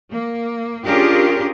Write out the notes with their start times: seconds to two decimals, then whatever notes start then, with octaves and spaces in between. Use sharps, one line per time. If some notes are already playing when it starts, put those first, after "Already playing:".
0.12 A#3
0.85 C#4 D4 F4 G4 G#4 A#4